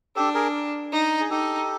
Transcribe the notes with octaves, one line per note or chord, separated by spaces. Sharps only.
D4 G4 A4
G#4 A#4
D#4
G#4
D#4 G4 A4